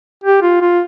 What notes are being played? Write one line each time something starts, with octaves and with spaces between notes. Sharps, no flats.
G4
F4
F4